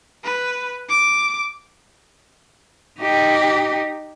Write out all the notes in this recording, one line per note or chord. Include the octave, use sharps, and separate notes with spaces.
B4
D6
D#4 G4